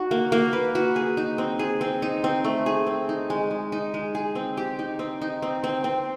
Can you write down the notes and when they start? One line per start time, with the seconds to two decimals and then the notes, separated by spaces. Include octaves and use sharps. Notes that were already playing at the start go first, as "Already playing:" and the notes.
Already playing: D#4 F#4
0.11 A#3
0.32 A#3
0.53 B4
0.75 F#4
0.96 G#4
1.17 D#4
1.38 C4
1.59 G#4
1.81 C4
2.02 D#4
2.24 C4
2.45 A3
2.66 G#4
2.87 C4
3.09 D#4
3.30 G#3
3.51 G#3
3.72 D#4
3.94 G#3
4.15 G#4
4.35 C4
4.57 G4
4.79 D#4
4.99 C4
5.22 D#4
5.42 C4
5.64 C4
5.84 C4